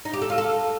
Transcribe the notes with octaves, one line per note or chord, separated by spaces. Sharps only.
D#4
G4
A4
F4
A4